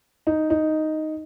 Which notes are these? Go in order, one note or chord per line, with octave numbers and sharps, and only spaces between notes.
D#4
D#4